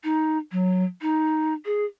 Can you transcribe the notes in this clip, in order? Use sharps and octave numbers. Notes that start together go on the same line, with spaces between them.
D#4
F#3
D#4
G#4